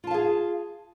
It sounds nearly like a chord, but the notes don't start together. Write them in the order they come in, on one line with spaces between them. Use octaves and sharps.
F4 A5 F5 G#4